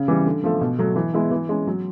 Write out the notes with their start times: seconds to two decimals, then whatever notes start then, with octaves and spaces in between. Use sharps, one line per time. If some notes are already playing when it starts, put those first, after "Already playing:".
Already playing: C#3
0.08 E3 G3
0.26 D3
0.44 F3 A3
0.61 B2
0.79 F#3 A3
0.96 E3
1.14 G#3 B3 E4
1.31 E3
1.49 G#3 C#4
1.67 F#3